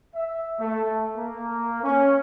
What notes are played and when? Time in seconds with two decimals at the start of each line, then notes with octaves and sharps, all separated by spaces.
0.15 E5
0.60 A3
1.17 A#3
1.84 C#4